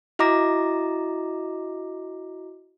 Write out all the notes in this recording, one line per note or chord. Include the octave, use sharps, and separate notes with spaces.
E4 F#4 D#5 A#5 D6 A#6